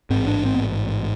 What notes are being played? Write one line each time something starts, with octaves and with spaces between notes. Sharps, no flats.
A1 G#2 C4
D4
C4
B3